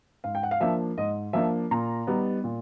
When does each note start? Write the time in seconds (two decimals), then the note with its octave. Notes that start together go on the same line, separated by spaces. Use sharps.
0.24 G#2 F5
0.35 G5
0.43 F#5
0.51 F5
0.60 F3 A#3 D4 E5
0.98 G#2 D#5
1.33 F3 A#3 D4 E5
1.71 A#2 A#5
2.07 G3 B3 D#4
2.44 A#2